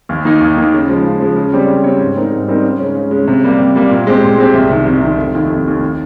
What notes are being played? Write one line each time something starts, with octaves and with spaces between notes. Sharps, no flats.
D#2
D#3 A#3 D#4
D#2
D#3 A#3 D#4
C#3
F3 G#3
C#3
F3 G#3
C#3
G3 C4 G4 C#5
C#3
G3 C4 G4 C#5
G#2
G3 C4 D#4 A#4
G#2
G3 C4 D#4 A#4
C#3
G#3 C#4
C#3
G#3 C#4
C3
G3 A#3
C3
G3 A#3
A#2
G#3 C4 G4
A#2
G#3 C4 G4
C2
C3 D#3
C2
C3 D#3
F1
D#2 D#3
F1
D#2 D#3
D#3